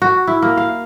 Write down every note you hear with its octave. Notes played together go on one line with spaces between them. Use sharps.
F#4
E4
A#3
F5